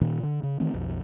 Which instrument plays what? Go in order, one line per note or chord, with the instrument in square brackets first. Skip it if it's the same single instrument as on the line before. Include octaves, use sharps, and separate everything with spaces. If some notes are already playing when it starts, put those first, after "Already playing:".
[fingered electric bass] A#2 D#3
D3
C#3
D#3 E3 A3 C4
B1 F2